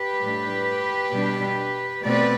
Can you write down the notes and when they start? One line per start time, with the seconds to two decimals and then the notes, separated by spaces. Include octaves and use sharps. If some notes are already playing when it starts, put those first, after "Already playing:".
Already playing: G4 B4
0.20 A2 G3 D4
1.12 B2 G3 D4
2.03 B2 A3 C4 B4 D5